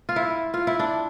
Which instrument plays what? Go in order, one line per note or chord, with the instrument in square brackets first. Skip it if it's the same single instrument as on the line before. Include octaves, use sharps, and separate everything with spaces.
[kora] F4
E4
F4
E4
D4